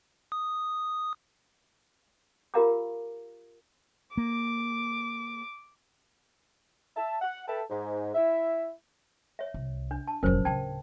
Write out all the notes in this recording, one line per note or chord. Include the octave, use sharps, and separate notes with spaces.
D#6
F4 G4 A#4 F5 A#5 D6
A#3 D6
E5 A5
F#5
A4 B4 E5 G5 A5
G#2
E4 E5
C#5 E5
C2
D4
A5
F1 A#1 F#3 C#4 A#4 C5
D1 C#3 G5 A5 G#6